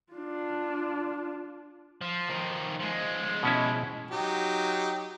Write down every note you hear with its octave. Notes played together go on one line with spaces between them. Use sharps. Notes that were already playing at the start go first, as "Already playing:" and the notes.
D4 F4
F3
D#3 F3
F3 G#3
B2 C#4 E4
F#3 D#4 G4